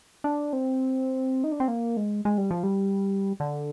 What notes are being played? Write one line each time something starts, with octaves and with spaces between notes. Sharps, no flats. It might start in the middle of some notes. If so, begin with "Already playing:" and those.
D4
C4
D#4
D4
C4
A#3
G#3
G#3
G3
F3
G3
D3